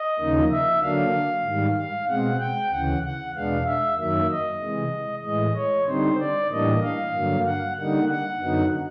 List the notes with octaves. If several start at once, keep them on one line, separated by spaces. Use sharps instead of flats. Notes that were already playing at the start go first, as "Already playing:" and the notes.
Already playing: D#5
D#2 C#3 F3 A#3 D#4
E5
D3 F#3 A#3 D4 F5
G#2 D#3 G3
F5
B2 G#3 C4 F#5
G5
D2 C#3 E3 F#5
F#5
E2 B2 G#3 B3 D4 F5
E5
F#2 D#3 F#3 A#3 E5
D#5
C3 E3 G#3
A2 E3 G#3 D#5
C#5
D3 G3 C4 D#4 C5
D5
A2 E3 G3 A#3 D4 D#5
F5
G2 D3 F#3 A#3
F#5
D3 G3 A#3 D#4 F#5
F#5
F#2 D3 F#3 B3 D#4